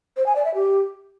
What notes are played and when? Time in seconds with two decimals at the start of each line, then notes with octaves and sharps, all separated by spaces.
0.17 C5
0.26 G#5
0.36 D5
0.45 E5
0.54 G4